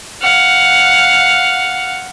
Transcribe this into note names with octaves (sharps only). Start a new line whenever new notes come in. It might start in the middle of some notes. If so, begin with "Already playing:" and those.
F5 F#5